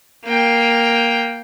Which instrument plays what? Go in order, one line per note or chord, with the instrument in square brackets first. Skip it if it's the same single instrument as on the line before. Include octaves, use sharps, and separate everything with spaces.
[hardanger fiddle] A#3 G5